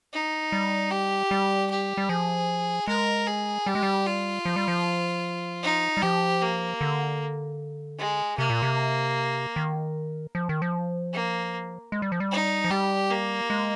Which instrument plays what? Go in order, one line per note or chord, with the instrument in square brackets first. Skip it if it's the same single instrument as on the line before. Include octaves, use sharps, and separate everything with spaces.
[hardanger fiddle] D#4
[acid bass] G3
[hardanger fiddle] G4
[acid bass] G3
[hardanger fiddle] G4
[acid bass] G3
[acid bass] F3 [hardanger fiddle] G#4
[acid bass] G#3 [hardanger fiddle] A#4
[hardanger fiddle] G#4
[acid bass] G3 [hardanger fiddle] G4
[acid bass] G#3
G3
[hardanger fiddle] F4
[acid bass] F3
G3
F3
[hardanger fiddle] D#4
[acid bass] G3
[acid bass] F3 [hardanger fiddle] G4
[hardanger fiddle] A#3
[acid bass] D3
[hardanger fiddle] G#3
[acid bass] C3 [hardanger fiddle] A#3
[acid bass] A#2
C3
D#3
F3
D#3
F3
[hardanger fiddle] A#3
[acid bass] G#3
G3
F3
G3
[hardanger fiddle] D#4
[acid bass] F3
[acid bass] G3 [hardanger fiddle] G4
[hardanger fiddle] A#3
[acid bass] G#3